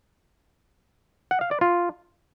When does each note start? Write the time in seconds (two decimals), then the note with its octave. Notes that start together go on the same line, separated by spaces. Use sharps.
1.31 F#5
1.41 F5
1.51 D5
1.61 F4